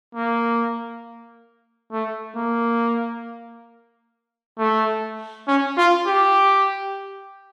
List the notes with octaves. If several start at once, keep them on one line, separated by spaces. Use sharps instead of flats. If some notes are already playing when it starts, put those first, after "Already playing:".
A#3
A3
A#3
A3
C#4
F4
G4